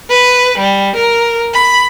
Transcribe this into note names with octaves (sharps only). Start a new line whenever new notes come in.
B4
G3
A#4
B5